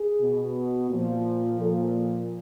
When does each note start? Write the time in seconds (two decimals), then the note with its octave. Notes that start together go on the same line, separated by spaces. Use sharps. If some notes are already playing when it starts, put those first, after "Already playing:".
Already playing: G#4
0.21 B2
0.91 A#2 F3
1.60 A#2 F3 A4